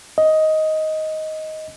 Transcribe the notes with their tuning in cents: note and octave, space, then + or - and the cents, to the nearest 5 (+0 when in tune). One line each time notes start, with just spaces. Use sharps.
D#5 +10